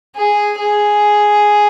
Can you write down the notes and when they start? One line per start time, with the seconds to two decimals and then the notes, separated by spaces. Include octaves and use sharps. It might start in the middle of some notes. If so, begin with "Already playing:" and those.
0.16 G#4
0.59 G#4